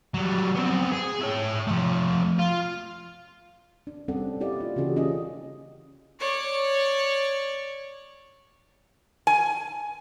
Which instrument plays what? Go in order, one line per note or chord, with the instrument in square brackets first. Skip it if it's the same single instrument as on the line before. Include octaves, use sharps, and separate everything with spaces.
[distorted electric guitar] F#3 G3
B3 C4
G#4
E4 C#5
F3 A3
F4
[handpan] D4
G3 C4 C#4 A4 D5 F#5
E4 G4 D5 D#5 F5
A#3 F4
C#3 E3 C#4 F#4 G#4 A4
C#4 E4 F4 G4 D#5
[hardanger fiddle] C#5 D5
[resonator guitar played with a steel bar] G#5